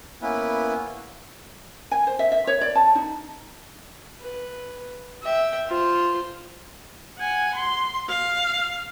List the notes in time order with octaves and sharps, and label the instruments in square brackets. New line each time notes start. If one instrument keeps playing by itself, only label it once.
[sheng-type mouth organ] A#3 B3 C#4 E4 B4
[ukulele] G#5
C5
E5
E5
C#5
D5
A5
D#4
[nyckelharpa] B4
E5 G5
F4 C5
[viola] F#5 G#5
C6
F5